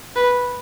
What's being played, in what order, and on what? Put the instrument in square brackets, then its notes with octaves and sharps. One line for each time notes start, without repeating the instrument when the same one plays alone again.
[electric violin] B4